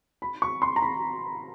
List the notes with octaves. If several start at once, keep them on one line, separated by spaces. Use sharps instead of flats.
B5
C#6
C6
A#5
B5